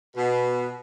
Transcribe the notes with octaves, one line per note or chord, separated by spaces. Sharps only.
B2